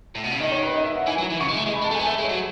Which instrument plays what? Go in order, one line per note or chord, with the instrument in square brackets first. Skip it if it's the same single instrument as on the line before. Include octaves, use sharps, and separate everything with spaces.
[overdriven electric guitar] A2
B2
C#3
[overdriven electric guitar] D#3 [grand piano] D#5
[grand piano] C#5
B4
D#5
E5
F#5
[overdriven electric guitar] E3 [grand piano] G#5
[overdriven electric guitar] F#3
E3
[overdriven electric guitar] C#3 [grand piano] C#6
[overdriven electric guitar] G#3
A3
G#3
[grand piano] B5
[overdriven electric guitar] G#3
[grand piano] A5
[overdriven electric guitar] A3
[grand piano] G#5
[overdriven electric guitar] B3
[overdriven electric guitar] A3 [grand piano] E5
[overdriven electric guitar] G#3
[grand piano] C#5
[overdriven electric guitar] F#3